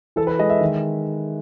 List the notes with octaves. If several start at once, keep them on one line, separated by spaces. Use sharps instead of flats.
E3 A4
B4
G#3 D#5
E5
D#3